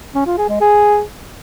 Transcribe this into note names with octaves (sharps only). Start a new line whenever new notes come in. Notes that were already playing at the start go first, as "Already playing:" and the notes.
C#4
F4
G#4
G#3
G#4